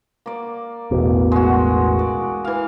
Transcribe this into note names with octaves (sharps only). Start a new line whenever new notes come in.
A#3 D5
A1 E2 B2
G#3 F#4
D5
E3 F5